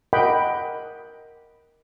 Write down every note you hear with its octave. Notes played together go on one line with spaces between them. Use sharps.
A#4 D#5 F#5 G5 B5 D6